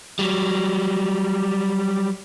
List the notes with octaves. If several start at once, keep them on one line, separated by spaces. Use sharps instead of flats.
F#3 G3